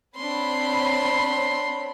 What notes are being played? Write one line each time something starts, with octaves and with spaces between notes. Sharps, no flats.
C4 D4 C#5 B5 C6